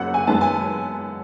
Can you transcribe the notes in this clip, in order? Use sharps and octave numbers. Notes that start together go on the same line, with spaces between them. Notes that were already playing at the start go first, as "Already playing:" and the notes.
Already playing: F#1 F#2 C#3 F#5
G#5
F#2 D#3 G#3 B3 A5
G#5